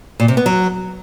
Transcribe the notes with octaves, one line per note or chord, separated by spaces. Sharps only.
A#2
C3
B3
F#3